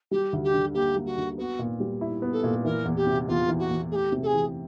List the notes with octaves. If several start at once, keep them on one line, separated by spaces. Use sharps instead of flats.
G3 G4
D2
G4
D3
A#3 G4
G3
F#4
D2
B3 F#4
A#2
G3
E4
B3
A4
A#2
E3 A#4
E2
G4
C3
E2 F4
E3
F#4
E2
A3 G4 G#4
C3
A4
G#4
E3